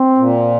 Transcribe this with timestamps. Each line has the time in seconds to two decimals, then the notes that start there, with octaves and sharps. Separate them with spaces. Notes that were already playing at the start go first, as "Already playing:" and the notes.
Already playing: C4
0.18 A#2